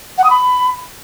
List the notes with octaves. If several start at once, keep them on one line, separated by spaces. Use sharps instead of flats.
F#5
D#6
B5